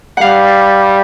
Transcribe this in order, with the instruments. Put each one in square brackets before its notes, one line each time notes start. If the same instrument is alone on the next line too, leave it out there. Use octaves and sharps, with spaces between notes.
[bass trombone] G3 [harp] F5 F#5